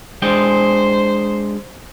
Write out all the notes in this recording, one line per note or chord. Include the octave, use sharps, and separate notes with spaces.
G#3 D4 C5 G5